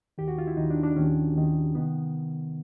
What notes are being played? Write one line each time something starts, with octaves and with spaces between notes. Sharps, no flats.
D#2 D#3 G4
F#4
F4
E4
D#2 D#3 D#4
D4
D4
D#2 D#3 C#4
D#2 D#3
C3 D#3 B3